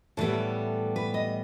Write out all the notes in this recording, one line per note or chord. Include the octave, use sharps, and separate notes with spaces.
A2 E3 G3 B3 A4
B4
D#5